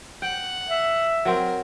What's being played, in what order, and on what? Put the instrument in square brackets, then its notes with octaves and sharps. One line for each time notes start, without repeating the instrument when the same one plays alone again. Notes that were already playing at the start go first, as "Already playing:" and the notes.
[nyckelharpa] F#5 [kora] G5
[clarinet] E5
[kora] F#3 C4 [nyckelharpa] A#4